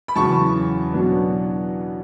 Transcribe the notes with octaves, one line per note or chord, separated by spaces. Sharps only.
B5
E2 C#3 F#3 A5 C#6
B2 F#3 B3 D4